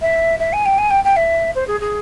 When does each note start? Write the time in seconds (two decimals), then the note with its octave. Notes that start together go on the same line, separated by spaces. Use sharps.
0.01 E5
0.39 E5
0.53 G#5
0.65 G5
0.78 G#5
0.90 G5
1.04 G5
1.16 E5
1.55 C5
1.67 G#4
1.80 G#4